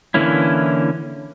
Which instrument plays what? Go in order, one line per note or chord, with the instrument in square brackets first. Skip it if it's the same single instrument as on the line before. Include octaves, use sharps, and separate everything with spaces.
[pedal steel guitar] D3 E3 A#3 C#4 E4